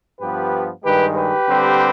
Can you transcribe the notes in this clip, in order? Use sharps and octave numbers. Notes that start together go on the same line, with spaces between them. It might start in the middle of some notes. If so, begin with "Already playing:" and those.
G2 F3 B3 G4 B4
G2 D#3 G#3 G4 B4
G4 B4
D3 G3 C4